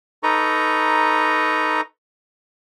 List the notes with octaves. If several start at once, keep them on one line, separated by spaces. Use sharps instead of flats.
D#4 A4 B4 A#5 C#6